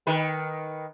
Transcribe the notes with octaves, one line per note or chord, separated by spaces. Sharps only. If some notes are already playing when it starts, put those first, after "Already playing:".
D#3 B4